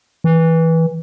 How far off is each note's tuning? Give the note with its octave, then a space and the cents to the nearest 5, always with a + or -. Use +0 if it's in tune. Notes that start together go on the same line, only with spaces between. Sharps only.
E3 -15